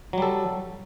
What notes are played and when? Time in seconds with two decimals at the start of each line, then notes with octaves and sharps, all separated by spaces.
0.13 F#3
0.18 G3
0.22 A4